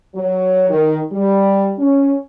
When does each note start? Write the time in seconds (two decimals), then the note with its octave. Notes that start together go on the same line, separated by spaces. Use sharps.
0.15 F#3
0.69 D#3
1.12 G3
1.78 C#4